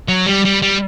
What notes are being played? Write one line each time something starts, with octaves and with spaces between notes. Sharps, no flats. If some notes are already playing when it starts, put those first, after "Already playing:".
F#3
G3
G3
G3